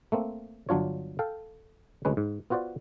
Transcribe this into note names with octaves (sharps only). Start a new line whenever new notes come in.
A3 A#3 C4
G1 F#3 D4 F4 C#5
A4 F5 G5
D2 G#3 C#4 B4
G#2
B3 F4 F#4 C5 D5